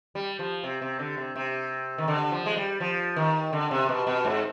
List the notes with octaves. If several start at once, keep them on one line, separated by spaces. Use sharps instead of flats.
G3
F3
C3
C3
D3
C3
C3
D#3
D3
F3
G#3
G3
F3
D#3
D3
C3
B2
B2
G#2